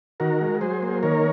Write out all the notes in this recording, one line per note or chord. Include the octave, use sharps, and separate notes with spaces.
D#3 F#4 A#4
G#3
F#3 G#4 C5
A#3
D#3 A#4 C#5